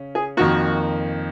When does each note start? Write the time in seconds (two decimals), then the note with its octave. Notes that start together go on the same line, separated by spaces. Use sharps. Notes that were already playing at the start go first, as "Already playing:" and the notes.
Already playing: C#3 C#4
0.15 G#4
0.37 F2 D#3 A#3 F#4